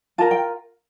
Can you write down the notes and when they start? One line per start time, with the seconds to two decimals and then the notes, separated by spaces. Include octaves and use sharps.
0.18 F4 A#4 A5
0.31 G5